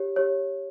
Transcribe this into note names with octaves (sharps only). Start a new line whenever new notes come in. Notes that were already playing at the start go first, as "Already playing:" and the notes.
Already playing: G4 C#5
G4 C#5